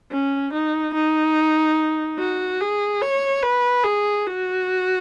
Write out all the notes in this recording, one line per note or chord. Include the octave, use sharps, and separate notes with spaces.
C#4
D#4
D#4
F#4
G#4
C#5
B4
G#4
F#4